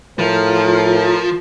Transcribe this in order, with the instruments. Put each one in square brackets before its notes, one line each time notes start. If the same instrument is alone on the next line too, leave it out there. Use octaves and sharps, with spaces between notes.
[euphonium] A2 [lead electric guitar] F3 [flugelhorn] A#4